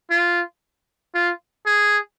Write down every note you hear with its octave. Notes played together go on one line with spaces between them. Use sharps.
F4
F4
G#4